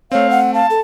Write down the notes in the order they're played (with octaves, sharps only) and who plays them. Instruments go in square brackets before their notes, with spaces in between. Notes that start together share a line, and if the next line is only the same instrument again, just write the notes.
[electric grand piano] A3 C4 [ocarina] C#5 [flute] F5
[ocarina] F#5
[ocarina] F5 [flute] A5
[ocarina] A4